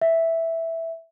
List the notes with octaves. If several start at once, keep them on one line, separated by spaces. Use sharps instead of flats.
E5